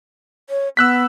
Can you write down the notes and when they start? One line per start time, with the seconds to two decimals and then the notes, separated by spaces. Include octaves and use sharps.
0.50 C#5
0.77 B3 E6 F#6 B6